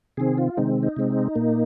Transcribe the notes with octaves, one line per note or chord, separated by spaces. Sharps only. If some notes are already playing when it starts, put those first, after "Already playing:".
C3 D#3 C4 G#4
F4
C3 D#3 G#3 C4 D#4
D#4
C3 G#3 C4
A#2 A#3